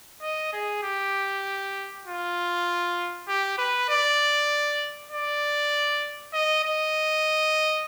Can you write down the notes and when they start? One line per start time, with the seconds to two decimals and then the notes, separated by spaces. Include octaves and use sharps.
0.22 D#5
0.53 G#4
0.83 G4
2.06 F4
3.28 G4
3.58 B4
3.89 D5
5.11 D5
6.33 D#5
6.64 D#5